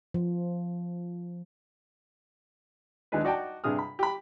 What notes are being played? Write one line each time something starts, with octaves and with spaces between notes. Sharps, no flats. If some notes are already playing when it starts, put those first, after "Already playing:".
F3
D#2 G#3 D4 D#4 B4
D#4 F#4 D5 G5 A5
G2 C3 D4 G#4 D#6 F6
B5
G4 B5